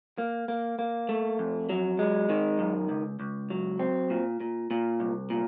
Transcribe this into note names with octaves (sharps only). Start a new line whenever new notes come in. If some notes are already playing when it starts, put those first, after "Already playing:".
A#3
A#3
A#3
A3
F2
F#3
G#3
D#3
F#2
C#2
C#2
F#3
C4
A#2
A#2
A#2
C2
A#2